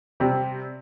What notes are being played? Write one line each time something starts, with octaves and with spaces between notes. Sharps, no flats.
C3 G3 C4 G4